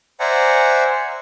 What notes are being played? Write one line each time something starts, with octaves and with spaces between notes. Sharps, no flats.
C5 D5 E5 F#5 G#5 A#5